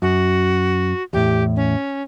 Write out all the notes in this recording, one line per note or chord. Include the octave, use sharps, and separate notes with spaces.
F#2 F#4
E2 A2 G4
C#4